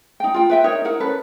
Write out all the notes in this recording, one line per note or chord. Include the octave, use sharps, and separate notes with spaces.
D#4 G5
F4 G5
B4 E5 G5
D#4 A#4 C#5
D#4 E4 A#4 F#5
C#4 A4 B4